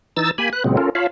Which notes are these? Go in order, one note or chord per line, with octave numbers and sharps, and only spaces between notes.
E3 D#4 E6 A6
A#3 G4 G#5 B5
B4 F#6
A#2 C#3 F#3 G#3 B3 C4
C#4 F4 A4 A#4
F4 C#5 F5 A5 B5